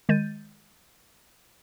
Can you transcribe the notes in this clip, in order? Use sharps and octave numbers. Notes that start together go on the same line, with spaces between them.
D#3 G#3 G6 A6 D#7